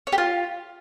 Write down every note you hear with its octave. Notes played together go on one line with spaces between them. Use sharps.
C#5
G4
F4